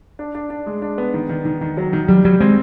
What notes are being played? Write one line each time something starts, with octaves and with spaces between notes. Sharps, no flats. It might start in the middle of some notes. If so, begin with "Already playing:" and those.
D4
D4
D4
G#3
D4
B3
D#3
D#3
D#3
D#3
F#3
D#3
F#3 G3
F#3 G3
G#3 C4